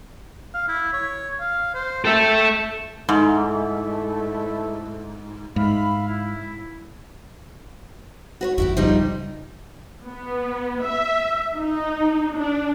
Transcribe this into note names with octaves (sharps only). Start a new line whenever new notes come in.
F5
E4
C#5
F5
C5
A4 E5 G5
G#2 A3 E4
G#2 E5 F5 B5
E4
F#4 B4 C#5
G1 F2 E4 F#4 G4
D1 C#3 F3 G3 D#4
B3
E5
D#4
D4